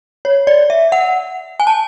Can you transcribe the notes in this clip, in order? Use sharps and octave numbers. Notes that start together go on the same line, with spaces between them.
C#5
D5
E5
F#5
G#5
A5